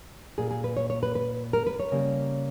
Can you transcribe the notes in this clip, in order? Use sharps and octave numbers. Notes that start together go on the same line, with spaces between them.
A#2 A#3 G#4
G#4
B4
C#5
C#5
B4
B4
A#4
B4
C#5
C#3 G3 A#3